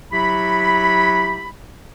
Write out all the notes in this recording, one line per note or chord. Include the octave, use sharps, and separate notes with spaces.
F#3 E4 G4 B5